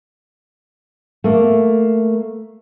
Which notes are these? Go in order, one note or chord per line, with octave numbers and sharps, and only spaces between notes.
A3 A#3